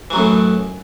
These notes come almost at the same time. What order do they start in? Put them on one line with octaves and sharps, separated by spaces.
E3 F#3 F#2 A2